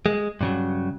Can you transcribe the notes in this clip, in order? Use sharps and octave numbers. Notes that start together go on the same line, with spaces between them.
G#3
G2 C#3 F#3